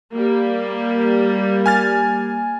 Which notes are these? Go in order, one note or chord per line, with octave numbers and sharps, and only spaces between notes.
G3 A#3
G#5 F6 A6